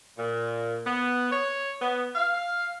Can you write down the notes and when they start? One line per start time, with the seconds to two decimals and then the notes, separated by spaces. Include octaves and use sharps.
0.18 A#2
0.86 B3
1.32 C#5
1.81 B3
2.15 F5